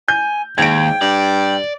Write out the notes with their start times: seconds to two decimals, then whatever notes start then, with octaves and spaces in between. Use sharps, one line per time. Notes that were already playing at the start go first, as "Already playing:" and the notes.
0.08 G#5 G6
0.58 D#2 G#2 G5 G#6 D7
1.01 G2 D5